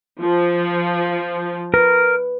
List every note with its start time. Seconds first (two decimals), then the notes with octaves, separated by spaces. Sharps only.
0.22 F3
1.74 A#4 B4